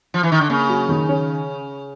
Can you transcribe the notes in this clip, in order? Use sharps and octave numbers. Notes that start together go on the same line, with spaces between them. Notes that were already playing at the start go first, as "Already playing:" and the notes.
F3
E3
D#3
D3
C#3 A#3
F#3
D#3
C#4